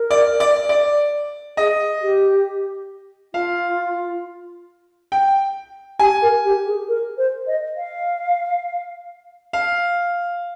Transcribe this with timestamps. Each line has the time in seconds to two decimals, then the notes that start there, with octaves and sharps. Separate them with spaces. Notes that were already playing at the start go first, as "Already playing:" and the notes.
Already playing: A#4
0.11 D5
0.40 D5
0.69 D5
1.57 G#4 D#5
2.02 G4
3.34 F4 F5
5.12 G5
5.99 G4 G#5
6.22 A#4
6.45 G4
6.66 G#4
6.88 A#4
7.18 C5
7.47 D#5
7.77 F5
9.53 F5